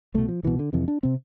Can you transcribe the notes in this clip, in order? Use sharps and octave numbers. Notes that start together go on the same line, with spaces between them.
C2 B2 A3
F3
C2 B2 E3
D3
F2 C3 E3
D4
C3 C4